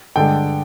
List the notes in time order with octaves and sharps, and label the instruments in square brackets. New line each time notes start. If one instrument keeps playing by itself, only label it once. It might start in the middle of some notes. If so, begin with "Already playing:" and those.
[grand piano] G2 D3 G#3 D4 G5